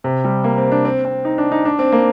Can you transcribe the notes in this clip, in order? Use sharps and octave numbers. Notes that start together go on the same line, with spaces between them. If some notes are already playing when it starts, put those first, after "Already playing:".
C3
G3
A#3
C4
D4
C4
C4
D#4
D4
D#4
D4
C4
A#3